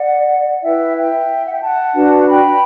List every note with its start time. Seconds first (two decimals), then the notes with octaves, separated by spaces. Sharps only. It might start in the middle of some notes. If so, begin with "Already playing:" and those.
Already playing: D5 F#5
0.63 E4 B4 E5 G5
0.96 E5 G5
1.46 F#5
1.54 G5
1.62 F#5 A5
1.95 D4 F#4 B4
2.28 G5 B5